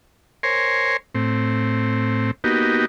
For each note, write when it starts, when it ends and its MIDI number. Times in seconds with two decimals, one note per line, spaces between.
0.43 0.97 70
0.43 0.97 72
0.43 0.97 73
0.43 0.97 80
0.43 0.97 84
1.15 2.31 45
1.15 2.31 60
2.44 2.86 58
2.44 2.86 59
2.44 2.86 63
2.44 2.86 66
2.44 2.86 67